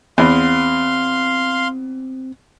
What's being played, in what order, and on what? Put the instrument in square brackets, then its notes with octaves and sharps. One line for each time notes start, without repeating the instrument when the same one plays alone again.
[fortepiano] E2 [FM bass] C4 [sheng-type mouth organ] F5 C6